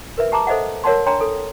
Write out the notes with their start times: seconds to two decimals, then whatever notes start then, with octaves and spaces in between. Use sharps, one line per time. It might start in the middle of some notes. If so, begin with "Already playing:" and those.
0.18 A#4 B4 E5
0.32 G4 A5 A#5 D6
0.47 A4 C5 D#5 E5 F#5
0.84 A#4 C#5 F#5 A5 C6
1.06 D4 C#5 G5 A#5 C6
1.21 A4